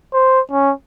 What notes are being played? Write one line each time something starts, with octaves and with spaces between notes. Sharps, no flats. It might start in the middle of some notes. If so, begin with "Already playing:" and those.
C5
C#4